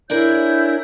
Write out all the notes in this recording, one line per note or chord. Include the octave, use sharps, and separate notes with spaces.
D4 E4 G#4 A#4 C#5 G6